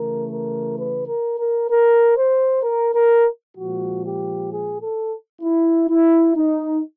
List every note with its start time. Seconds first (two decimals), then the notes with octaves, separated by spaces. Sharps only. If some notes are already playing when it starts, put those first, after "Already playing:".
Already playing: C#3 E3 A3 A#4
0.29 A#4
0.76 B4
1.07 A#4
1.38 A#4
1.69 A#4
2.16 C5
2.62 A#4
2.93 A#4
3.55 A#2 F3 G#3 F#4
4.02 G4
4.49 G#4
4.80 A4
5.42 E4
5.89 E4
6.35 D#4